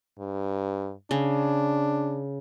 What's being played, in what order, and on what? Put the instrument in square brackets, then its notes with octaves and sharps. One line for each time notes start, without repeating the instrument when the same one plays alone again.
[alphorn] G2
[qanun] C#3 [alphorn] D4